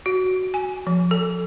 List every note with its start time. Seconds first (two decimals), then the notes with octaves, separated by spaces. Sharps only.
0.06 F#4
0.54 G#5
0.87 F3
1.11 A4